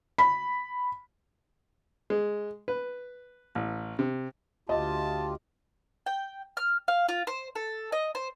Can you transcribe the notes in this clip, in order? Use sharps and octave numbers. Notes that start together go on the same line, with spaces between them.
B5
G#3
B4
A1
C3
D2 F4 G4 D#5 A5
G5
F6
F5
F4
C5
A4
D#5
C5